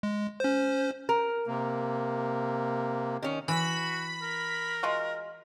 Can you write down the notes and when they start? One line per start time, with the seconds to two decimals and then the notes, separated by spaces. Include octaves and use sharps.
0.03 G#3
0.40 C#4 C5
1.09 A#4
1.47 C3 A#3
3.23 D#3 C#4
3.48 E3 F#4 B5
4.22 A#4
4.83 G#3 F4 F#4